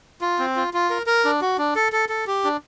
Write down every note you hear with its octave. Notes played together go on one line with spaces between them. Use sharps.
F4
C4
F4
F4
A#4
A#4
D4
F#4
D4
A4
A4
A4
G4
D4